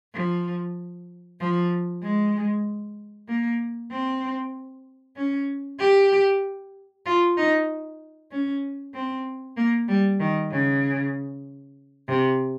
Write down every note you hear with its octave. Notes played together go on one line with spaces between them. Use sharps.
F3
F3
G#3
A#3
C4
C#4
G4
F4
D#4
C#4
C4
A#3
G3
D#3
C#3
C3